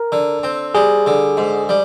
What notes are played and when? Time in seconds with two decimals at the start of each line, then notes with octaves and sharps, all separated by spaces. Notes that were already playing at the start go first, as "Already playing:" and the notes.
Already playing: A#4
0.12 D3
0.43 C4
0.75 G3 G#4
1.06 D3
1.37 G#2
1.69 G3